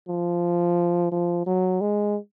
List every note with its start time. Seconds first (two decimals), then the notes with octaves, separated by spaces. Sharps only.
0.08 F3
1.12 F3
1.46 F#3
1.81 G#3